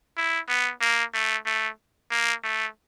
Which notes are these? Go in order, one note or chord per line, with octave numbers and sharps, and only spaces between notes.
E4
B3
A#3
A3
A3
A#3
A3